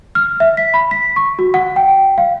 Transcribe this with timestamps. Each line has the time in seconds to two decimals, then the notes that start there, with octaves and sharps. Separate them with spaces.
0.15 F6
0.40 E5
0.57 B6
0.74 B5
0.91 B6
1.16 C#6
1.39 F#4
1.54 F#5
1.76 G5
2.18 F5